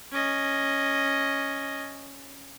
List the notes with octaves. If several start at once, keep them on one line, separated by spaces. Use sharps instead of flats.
C#4 D#5